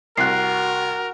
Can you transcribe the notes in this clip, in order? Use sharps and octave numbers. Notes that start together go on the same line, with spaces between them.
C2 F#4 A#4 F#6 C7